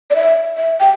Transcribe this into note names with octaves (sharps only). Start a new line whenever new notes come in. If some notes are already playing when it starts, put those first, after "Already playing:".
D5
E5
E5
G5